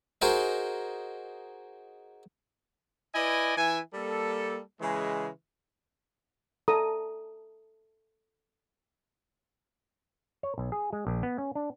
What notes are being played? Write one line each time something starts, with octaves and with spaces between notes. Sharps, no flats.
D#4 F#4 G#4 A#4 C5 D#5
E4 B4 D5 D#5 G#5
E3 E4 E5 G#5
G3 A#3 A4
C#3 E3 G#3
A4 A#5 D#6
C#5
B1
G#4
G#3
A#1
B3
C#4
D4